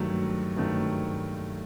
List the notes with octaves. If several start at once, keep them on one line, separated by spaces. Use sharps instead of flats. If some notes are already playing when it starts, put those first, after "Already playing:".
Already playing: G2 D#3 F#3 A3
G2 D#3 F#3 A3